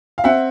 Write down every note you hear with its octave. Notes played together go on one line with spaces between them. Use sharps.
F5
C4 E5 F#5